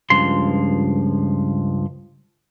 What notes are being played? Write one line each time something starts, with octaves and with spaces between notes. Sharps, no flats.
C#2 G2 F3 C6